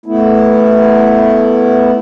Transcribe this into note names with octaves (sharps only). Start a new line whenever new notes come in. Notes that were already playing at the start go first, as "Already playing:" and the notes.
A3 B3 E4